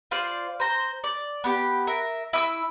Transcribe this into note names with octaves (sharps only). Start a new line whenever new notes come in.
F4 C5 D5
C5 A#5
D5
B3 G4
A#4 E5
E4 D#6 E6